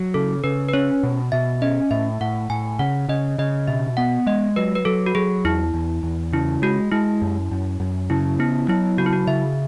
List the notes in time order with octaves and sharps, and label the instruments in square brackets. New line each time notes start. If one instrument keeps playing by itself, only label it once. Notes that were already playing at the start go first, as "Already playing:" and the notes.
Already playing: [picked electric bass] F#3
[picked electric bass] C#3 [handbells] A4
[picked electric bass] C#3 [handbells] B4
[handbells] B4
[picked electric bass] C#4 [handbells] C#5
[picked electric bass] B2
[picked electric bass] B2 [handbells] E5
[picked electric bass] C#4 [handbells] D#5
[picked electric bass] A2 [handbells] E5
[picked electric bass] A2 [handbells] F#5
[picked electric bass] A2 [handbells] G#5
[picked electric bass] C#3 [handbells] F#5
[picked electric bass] C#3 [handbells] D#5
[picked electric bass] C#3 [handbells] D#5
[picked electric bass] B2 [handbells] E5
[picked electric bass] B3 [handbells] F#5
[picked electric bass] G#3 [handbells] D#5
[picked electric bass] F#3 [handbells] B4
[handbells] B4
[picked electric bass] F#3 [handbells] A4
[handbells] F#4
[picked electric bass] F#3 [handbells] G#4
[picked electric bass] E2 [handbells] E4
[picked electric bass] E2
E2
[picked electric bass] C#3 [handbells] E4
[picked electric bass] G#3 [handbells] F#4
[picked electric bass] G#3 [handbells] E4
[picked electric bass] F#2
F#2
F#2
[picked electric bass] C#3 [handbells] E4
[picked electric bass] B3 [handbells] E4
[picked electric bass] F#3 [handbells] E4
[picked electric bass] C#3 [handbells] F#4
[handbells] E4
F#4
[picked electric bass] C#3 [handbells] E5